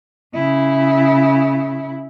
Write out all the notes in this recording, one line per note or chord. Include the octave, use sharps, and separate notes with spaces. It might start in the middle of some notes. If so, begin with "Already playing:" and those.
C#3 E4